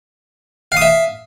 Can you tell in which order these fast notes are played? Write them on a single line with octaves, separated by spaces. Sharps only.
F5 D#6 E5